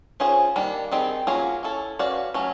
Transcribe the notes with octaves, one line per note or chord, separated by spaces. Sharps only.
C#4 F4 G#4 C5
D#3 G3 A#3 D4
D#3 G3 C4 D#4 G#4
F#3 A#3 C#4 F4 G#4
C#4 E4 A4
C#4 F#4 B4 D5 F5
F#3 A3 C#4